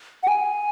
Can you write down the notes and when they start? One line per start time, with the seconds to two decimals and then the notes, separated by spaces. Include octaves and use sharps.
0.23 F#5
0.28 G#5